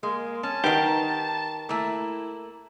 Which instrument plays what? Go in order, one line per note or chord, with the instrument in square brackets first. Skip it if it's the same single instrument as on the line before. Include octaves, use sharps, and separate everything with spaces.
[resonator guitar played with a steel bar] G#3 [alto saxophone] A#3
[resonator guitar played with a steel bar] C#4 [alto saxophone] A5
[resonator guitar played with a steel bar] D#3 A#4 [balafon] D#4 B4 F#5 [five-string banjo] G4
[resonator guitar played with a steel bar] A3 A#3 [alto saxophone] E4